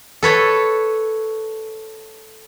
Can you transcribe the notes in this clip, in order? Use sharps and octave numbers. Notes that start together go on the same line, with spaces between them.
A4 B4 C#5 A5